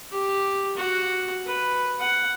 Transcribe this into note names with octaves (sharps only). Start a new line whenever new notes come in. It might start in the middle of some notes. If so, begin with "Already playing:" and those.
G4
F#4
B4
F#5